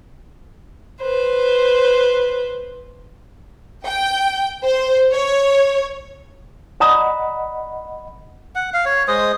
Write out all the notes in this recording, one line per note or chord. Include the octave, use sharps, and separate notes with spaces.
B4 C5
G5
C5
C#5
D5 D#5 F#5 A#5 B5 D#6
F#5
F5
C#5
G#3 C5 D#5 D#6